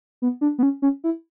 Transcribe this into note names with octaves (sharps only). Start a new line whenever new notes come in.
B3
D4
B3
C#4
C#4
E4